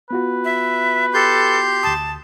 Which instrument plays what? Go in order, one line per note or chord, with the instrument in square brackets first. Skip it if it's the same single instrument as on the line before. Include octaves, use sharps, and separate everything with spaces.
[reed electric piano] B3 F4 F#4 [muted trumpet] B4
[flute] E5
[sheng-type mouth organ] G4 C6 G6 [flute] A4
[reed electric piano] D2 D#6 [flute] A5